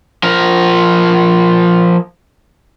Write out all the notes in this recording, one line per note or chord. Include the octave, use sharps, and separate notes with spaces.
F3 A#4